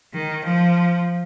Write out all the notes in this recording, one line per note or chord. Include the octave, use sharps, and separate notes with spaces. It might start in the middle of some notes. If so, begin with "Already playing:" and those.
D#3
F3